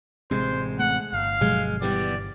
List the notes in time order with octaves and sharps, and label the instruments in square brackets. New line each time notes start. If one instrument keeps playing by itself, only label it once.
[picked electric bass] A1 C3 C4 [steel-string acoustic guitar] G#3 [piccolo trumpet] C5
[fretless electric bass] A3 [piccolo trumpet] F#5
[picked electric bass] G1 [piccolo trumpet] F5
[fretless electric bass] B2 F3 F#3 [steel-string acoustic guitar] G#3
[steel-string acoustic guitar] E3 G3 B3 [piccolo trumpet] D5